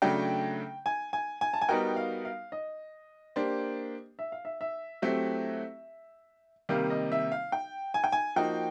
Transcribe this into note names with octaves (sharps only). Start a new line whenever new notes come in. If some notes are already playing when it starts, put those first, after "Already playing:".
C#3 F#3 A3 D4 G5
G#5
G#5
G#5
A5
G#5
G3 B3 D#4 F#4 A#4 G5
F5
F5
D#5
A#3 D4 G4 C5
E5
F5
E5
E5
F#3 A3 C4 E4 G4 E5
C3 D#3 G3 A#3 F5
D#5
E5
F5
G5
G#5
G5
G#5
F3 A#3 D#4 F#4 G5